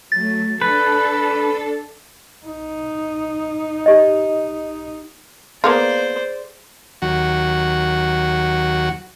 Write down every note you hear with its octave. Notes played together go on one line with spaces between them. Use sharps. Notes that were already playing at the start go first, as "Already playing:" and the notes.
F#3 A3 A6
D4 A4 B4
D#4
G4 D#5
A#3 B3 F4 G#4 C5 D5
D#2 F#3 F#4